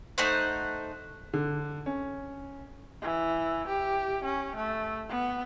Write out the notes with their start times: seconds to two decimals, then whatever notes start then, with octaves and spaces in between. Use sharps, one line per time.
0.18 A3 D#4 C5 F#5
1.33 D3
1.86 C#4
3.02 E3
3.68 G4
4.24 C#4
4.55 A3
5.09 B3